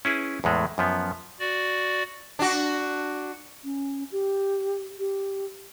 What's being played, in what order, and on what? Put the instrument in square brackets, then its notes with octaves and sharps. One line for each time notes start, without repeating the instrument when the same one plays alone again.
[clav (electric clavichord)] C#4 E4 G#4 B4
E2 A2 G#3 A3
F#2 F3 B3
[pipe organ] F#4 D5
[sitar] D4 F#4
[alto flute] C#4
G4
G4